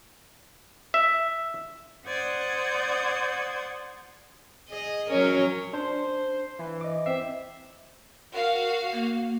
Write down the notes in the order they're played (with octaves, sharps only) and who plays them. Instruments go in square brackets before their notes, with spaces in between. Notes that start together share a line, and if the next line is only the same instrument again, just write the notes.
[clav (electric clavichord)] E5
[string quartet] C5 D5 F#5 D#6 G6 G#6
[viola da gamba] G#4 D#5
[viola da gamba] F#3 A#4 [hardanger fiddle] C#4
[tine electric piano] D4 [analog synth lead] C5
[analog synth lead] E3
[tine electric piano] D#5 D6
[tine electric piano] C4 C7 [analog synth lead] E5
[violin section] F#4 F5 [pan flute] A#4
[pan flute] A#3